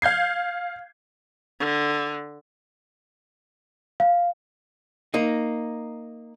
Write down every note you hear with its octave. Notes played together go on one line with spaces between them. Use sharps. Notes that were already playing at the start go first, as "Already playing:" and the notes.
F5 G6 G#6 C7
D3
F5
A#3 D#4